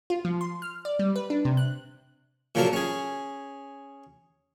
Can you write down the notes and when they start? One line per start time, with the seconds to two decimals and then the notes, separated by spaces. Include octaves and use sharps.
0.10 F4
0.25 F3
0.41 C6
0.62 F6
0.85 D5
0.99 G3
1.16 B4
1.30 D4
1.45 C3
1.57 F#6
2.55 A#2 C#3 F3 F#3 A4 A#4
2.73 C#4 G#4